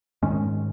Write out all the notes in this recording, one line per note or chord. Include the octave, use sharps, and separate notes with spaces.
G#2 D#3 G#3 C#4